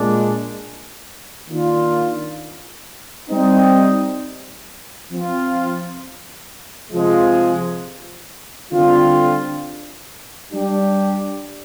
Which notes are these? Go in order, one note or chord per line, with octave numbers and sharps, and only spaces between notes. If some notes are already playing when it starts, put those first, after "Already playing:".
Already playing: A#2 G#3 D4
D#3 A#3 D4 F4
G3 C4 D#4
F3 C4 F4
C3 F3 G#3
D3 G3 C4 F4
G3 D4 G4